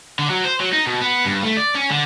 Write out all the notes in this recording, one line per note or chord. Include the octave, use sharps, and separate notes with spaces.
D3
F#3
C5
F#3
D#4
B2
B3
G2
A3
D5
C#4
D3